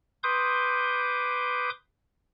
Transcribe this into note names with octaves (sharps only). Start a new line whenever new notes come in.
B4 C6 D6 D#6 G6